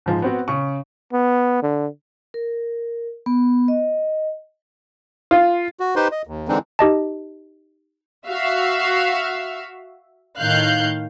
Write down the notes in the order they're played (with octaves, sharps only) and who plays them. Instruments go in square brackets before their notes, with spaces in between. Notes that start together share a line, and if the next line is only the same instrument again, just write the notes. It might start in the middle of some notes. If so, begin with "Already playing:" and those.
[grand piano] G#2 F3 G#3
B3 C4 F#4
C#3 C#6
[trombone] B3
D3
[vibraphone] A#4
B3
D#5
[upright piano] F4
[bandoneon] F#4
D#4 G4 B4 C5 C6
D#5
D#2
D3 E3 G#3 C4 D4 D#4
[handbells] D#4 G4 D#5 A5
[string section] F#4 E5 F5
A2 D#3 F5 F#6 G6